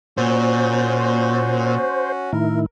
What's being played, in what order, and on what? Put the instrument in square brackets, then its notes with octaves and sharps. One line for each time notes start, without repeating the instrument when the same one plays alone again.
[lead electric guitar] A#2 [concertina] C#4 F#4 [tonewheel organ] C5
[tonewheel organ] A2 D#3 E4 [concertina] A#4